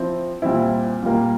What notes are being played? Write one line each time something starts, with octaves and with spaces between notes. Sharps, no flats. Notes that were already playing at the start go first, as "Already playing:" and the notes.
Already playing: F3 C4 E4
A#2 G3 C4 E4
A#2 G3 A#3